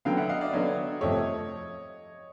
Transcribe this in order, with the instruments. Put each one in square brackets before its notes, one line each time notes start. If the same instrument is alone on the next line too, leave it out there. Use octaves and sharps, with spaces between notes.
[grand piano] D3 F#3 B3 [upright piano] F5 G5
[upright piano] E5 F#5
D#5 F5
D5 E5
[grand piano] D3 F#3 B3 [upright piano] C#5 D#5
[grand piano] F2 C3 F3 A3 [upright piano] C#5 D#5